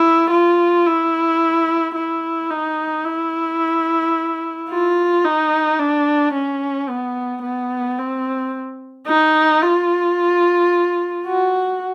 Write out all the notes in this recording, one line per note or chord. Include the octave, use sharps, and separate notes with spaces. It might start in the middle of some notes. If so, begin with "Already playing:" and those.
Already playing: E4
F4
E4
E4
D#4
E4
F4
D#4
D4
C#4
B3
B3
C4
D#4
F4
F#4